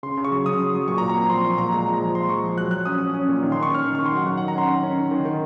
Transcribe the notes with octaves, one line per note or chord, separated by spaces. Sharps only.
C#3 C6
C#3
C#6
F#3
C#3 D#6
F#3
F#3
A#2 C#6
A#5
A#2
A#5
C4
F3 C6
A#2 C6
A#2 A#5
G#3 A#5
F3
A#5
F3
G#3 C6
F3 C#6
F3
F#3 F#6
F#3 F#6
C#4 D#6
C#4
C#4
A#2
D#3
C#4 C6
C#6
C#4 F6
D#3
D#3 C#6
C6
F#3 F#5
D#3 F#5
D#3 F#5
A#5
C#4 C6
D#3
C#4
D#3
D#3
D#3